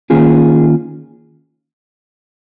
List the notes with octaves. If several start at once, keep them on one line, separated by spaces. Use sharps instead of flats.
D#3 A#3 C#4 F4 G#4